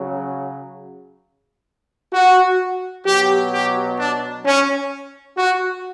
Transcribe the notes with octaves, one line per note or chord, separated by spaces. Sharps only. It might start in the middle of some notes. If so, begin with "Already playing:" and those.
Already playing: C#3 F#3
F#4
B2 F#3 G4
G4
D4
C#4
F#4